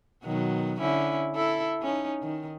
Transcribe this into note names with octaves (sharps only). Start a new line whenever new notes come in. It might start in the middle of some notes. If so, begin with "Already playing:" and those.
B2 D#3 F#3
D3 C#4 E4
E4 A4
C#4 D#4
D#3